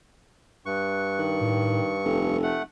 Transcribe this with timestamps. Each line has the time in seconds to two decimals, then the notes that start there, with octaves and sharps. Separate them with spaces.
0.66 G2 C#6 F#6
1.18 D#3
1.41 A2
2.04 F1 A4
2.43 A3 F#5